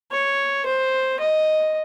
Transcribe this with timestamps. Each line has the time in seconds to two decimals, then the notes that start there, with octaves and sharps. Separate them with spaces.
0.12 C#5
0.66 C5
1.20 D#5